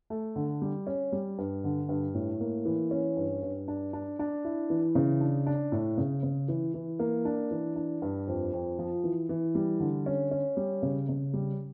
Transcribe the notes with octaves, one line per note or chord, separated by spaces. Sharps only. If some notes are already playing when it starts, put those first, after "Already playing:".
A3
D3
G3
C#4
G3
G2
D3
G2
A2
A#3
E3
C#4
G2
G2
D4
D4
D4
E4
E3
C#3
D4
D4
A2
C#3
C#3
E3
E3
A#3
D4
E3
D4
G2
F2
F2
F3
E3
E3
G3
D3
C#4
C#4
G3
C#3
C#3
G3